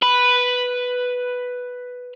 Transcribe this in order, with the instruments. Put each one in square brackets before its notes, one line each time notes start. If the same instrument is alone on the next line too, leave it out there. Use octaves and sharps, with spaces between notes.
[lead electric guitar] B4 B5